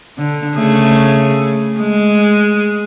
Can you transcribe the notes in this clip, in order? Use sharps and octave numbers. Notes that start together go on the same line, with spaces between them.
D3
C#3 A3 G#4
G#3